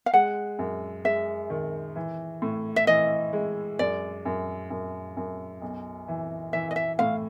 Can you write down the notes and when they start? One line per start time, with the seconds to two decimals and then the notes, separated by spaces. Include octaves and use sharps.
0.06 F5
0.13 G#3 F#5
0.59 F#2
1.05 G#3 E5
1.50 D#3
1.96 E3
2.42 A2
2.76 E5
2.87 E3 D#5
3.33 G#3
3.79 F#2 D5
4.25 F#2
4.70 F#2
5.17 F#2
5.62 B1
6.08 E3
6.53 E3 E5
6.71 D#5
6.76 E5
6.99 A2 F5